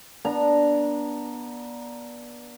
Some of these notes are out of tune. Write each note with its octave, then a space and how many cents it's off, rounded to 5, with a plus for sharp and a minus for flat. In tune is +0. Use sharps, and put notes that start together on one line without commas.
B3 -35 D4 -5 A#5 +0